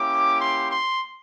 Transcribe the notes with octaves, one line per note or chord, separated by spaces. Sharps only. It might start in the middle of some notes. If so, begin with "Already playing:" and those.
Already playing: A#3 C#4 E4 G4 D6
C6
C6